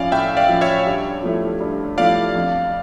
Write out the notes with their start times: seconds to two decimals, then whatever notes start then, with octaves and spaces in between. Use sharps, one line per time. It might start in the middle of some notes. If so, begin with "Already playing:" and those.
Already playing: A2 F3 C#4 D5 F5
0.12 A2 E5 G5
0.37 D5 F5
0.49 F3 C#4
0.61 C#5 E5
0.87 G2
1.23 F3 A3 E4
1.60 G2
1.98 F3 A3 E4 D5 F5
2.35 F2